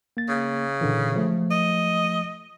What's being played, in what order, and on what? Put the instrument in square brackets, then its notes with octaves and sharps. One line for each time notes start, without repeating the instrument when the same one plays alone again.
[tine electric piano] A#3 A6
[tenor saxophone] C#3
[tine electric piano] A#2 D3 E3
F3 A3
[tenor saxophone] D#5